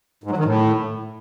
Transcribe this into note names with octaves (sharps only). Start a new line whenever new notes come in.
G#2
F#3
D#3
A2